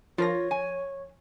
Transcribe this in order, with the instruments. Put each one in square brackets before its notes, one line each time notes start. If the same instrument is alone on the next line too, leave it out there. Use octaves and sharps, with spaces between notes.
[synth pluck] F3 A#4 A#6 [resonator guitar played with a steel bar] F4 [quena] C#5
[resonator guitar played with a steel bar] G#5